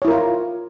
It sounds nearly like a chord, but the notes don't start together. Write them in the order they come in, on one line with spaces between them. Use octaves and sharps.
C#5 E4 A#4 F4